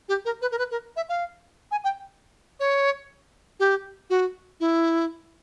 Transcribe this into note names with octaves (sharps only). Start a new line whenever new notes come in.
G4
A#4
B4
A#4
B4
A#4
E5
F5
G#5
G5
C#5
G4
F#4
E4